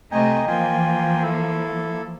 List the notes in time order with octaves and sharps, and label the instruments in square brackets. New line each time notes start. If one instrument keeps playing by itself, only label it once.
[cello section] C3 A3 D#5 [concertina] G5 G#5 A#5
[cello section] E3 F3 A#3 [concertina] F4 G5 G#5
[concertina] E4 A4